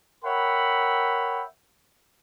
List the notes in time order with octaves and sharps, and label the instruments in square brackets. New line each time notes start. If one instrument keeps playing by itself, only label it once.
[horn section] A#4 C#5 E5 F#5 G5 B5